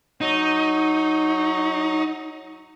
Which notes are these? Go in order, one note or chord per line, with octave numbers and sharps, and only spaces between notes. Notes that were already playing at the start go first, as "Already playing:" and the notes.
F#3 D#4